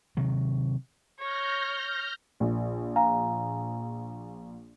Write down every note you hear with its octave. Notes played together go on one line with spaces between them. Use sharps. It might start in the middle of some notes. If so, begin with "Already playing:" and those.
C3 D#3 F#3
C#5 F6 G6 A#6
A#1
F5 G#5 A#5